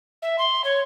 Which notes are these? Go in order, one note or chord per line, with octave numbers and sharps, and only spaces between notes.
E5
C6
C#5